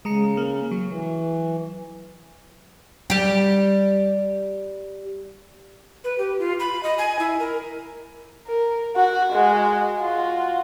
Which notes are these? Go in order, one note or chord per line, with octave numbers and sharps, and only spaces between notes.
C#3 G#3 A#5 C#7
A#3
F#3
E3
G3 G4
B4
G4
F4
B5
D#5
G#5
E4
A#4
A#4
F#4 F#5
G#3 F#4
F4 F#4